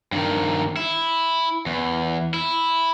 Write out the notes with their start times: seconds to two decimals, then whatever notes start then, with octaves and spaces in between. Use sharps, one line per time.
0.12 G2 D#3
0.77 E4
1.66 E2
2.34 E4